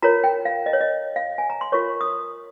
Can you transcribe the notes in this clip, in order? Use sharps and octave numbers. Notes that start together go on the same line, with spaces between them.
F4 A#4 C#5 A#5
G5
F5
D#5
C#5
D#5
F5
G#5
A#5
C6
F4 A#4 C#5 C#6
D#6